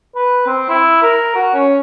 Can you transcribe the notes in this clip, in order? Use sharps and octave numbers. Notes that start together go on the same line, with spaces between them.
B4
C4
E4
A#4
F#4
C#4